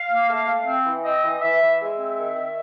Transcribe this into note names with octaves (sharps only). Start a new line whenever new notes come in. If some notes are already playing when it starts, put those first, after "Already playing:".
Already playing: F5
A#3
A3
A3
C4
E3
C4 D#5
E3
E3 E5
E3
G#3 E5
C4
D#3
D#3